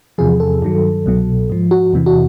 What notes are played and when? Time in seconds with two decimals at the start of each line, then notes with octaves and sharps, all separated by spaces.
0.18 E2 C3 F3 G#4
0.40 A4
0.62 G2 D#3 F#3
1.06 C2 B2 F#3
1.50 G#2 F3
1.71 F#4
1.93 E2 C3 E3
2.06 F#4